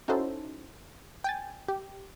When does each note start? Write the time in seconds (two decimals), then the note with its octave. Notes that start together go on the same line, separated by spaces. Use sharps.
0.08 C#4 D#4 E4 F#4 A4 C5
1.24 G5 G#5 A6
1.68 G4